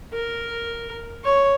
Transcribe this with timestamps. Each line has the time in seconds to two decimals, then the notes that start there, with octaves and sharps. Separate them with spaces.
0.13 A#4
1.24 C#5